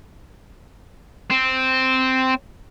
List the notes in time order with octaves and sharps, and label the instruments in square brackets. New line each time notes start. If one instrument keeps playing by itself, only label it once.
[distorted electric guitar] C4